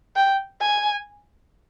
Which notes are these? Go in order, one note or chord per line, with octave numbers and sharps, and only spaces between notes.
G5
G#5